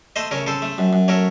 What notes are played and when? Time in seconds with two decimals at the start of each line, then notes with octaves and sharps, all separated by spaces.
0.16 A3 C5 D#5
0.31 C#3 A#4 C#5
0.47 C#3 A4 C5
0.62 A3
0.78 F#2
0.93 F#2
1.08 A3 A#4 C#5